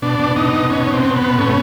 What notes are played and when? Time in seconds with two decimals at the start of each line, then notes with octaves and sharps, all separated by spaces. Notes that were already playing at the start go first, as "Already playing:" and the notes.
0.02 B2 D4
0.19 B2
0.36 B2 D#4
0.53 B2
0.70 B2 C#4
0.87 B2
0.93 C4
1.04 B2
1.16 B3
1.21 B2
1.38 A2 C#4